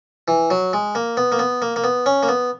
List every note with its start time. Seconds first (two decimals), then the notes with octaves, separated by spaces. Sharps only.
0.28 E3
0.50 F#3
0.73 G#3
0.95 A#3
1.17 B3
1.32 A#3
1.39 B3
1.62 A#3
1.76 A#3
1.84 B3
2.06 C#4
2.23 A#3
2.29 B3